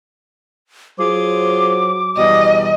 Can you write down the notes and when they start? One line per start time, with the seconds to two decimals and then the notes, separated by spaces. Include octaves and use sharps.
0.99 F#3 F4 G#4 C5 D6
2.17 E2 B2 G3 D#5